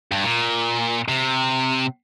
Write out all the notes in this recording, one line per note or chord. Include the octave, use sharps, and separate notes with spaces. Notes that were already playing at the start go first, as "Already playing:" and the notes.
G2
A#2
C3